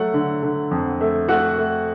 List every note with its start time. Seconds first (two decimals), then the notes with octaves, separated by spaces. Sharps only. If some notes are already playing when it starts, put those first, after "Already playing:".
Already playing: F#3 A3 F#5
0.14 D3
0.43 D3
0.71 F2
1.01 A3
1.28 A3 F#4 F#5
1.58 A3